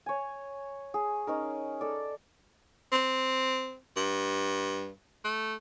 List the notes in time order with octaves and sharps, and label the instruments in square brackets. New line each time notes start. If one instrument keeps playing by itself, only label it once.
[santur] C#5 G#5
G#4
C#4 D#4 A#4
A4 D5
[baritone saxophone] C4
G2
A3